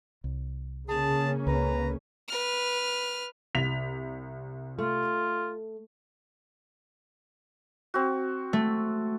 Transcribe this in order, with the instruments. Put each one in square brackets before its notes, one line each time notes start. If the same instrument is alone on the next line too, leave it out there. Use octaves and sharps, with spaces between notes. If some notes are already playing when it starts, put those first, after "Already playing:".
[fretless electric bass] C2
[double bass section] C#3 A#3 C#4 [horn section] G#4 A5
[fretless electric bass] C#2 [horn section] B4 A#5
[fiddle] B4 F6
[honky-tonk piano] C2 B6 F7
[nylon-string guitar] A3 [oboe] F4
[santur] C4 F#4
[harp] A3